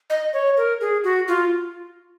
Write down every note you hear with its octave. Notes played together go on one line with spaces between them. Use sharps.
D#5
C#5
A#4
G#4
F#4
F4